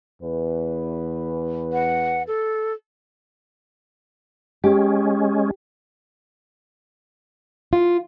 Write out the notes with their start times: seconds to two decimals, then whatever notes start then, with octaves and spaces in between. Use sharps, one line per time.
0.23 E2 B4
1.73 F#5
2.27 A4
4.64 G#3 C#4 G4
7.73 F4